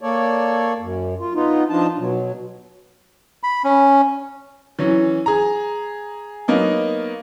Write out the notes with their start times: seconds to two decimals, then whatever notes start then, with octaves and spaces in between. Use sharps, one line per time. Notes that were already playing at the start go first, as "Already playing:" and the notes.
0.01 A#3 A4 C#5 D5
0.80 F#2
1.19 F4
1.35 B3 D#4 F4
1.70 F3 D4 D#4 F4 A5
1.98 B2 F#3
3.43 B5
3.64 C#4
4.79 E3 F#3 C#4
5.26 G#4 A#5
6.48 F#3 A#3 B3 D#4